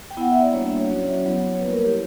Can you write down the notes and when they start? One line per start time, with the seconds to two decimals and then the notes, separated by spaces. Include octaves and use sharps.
0.11 G5
0.17 B3 E4 F#5
0.31 E5
0.42 D5
0.52 G3 A#3 D4 F#4 C#5
0.65 E5
0.77 C#5
0.89 F#3 C#4 F#4
1.25 F#3 B3 E4
1.55 C#5
1.61 G3 A#3 E4 B4
1.72 A#4
1.85 G4